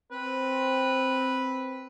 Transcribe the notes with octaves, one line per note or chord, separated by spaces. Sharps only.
C4 B4